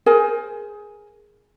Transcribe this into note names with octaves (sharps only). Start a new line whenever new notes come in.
G#4 A#4 C5 G#5